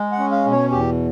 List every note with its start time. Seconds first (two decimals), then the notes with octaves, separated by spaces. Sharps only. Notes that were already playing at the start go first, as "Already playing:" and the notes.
Already playing: G#3
0.12 F#5
0.19 C#4
0.32 F5
0.46 B2
0.51 C#5
0.71 E2 G4